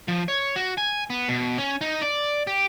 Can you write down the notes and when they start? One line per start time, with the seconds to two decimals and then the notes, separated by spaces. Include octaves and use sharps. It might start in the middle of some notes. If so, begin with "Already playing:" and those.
0.08 F3
0.28 C#5
0.56 F#4
0.78 G#5
1.10 B3
1.29 B2
1.58 C#4
1.81 D#4
2.02 D5
2.47 G4